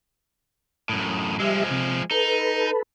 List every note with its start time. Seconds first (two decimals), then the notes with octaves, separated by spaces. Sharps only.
0.89 F#2 A2 D#6
1.40 F3 G3 G#3 E5
1.71 C3
2.11 D#4 A4 B4